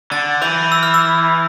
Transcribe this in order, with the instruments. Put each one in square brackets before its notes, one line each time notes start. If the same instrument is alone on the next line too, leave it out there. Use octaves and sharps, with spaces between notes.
[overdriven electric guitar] D3 [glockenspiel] A6
[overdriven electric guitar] E3 [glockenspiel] G6
[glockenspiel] E6
F6
E6